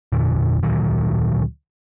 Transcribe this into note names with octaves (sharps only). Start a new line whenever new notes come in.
E2 A#2 D3
D2 A#2 D#3 F#3